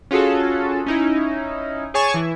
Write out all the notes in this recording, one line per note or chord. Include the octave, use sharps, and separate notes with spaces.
C#4 F4 F#4 G#4 A4
C#4 D#4 E4
G#4 C#5 G#5 A5 C#6
E3 E4